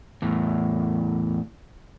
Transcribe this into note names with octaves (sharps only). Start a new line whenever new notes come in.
E2 A2